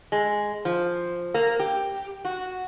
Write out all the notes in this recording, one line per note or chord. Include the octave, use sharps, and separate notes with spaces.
G#3
F3
A#3
G4
F#4